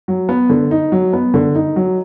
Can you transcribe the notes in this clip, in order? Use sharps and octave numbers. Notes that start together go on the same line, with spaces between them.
F#3
B3
D3
D#4
F#3
B3
D3
D#4
F#3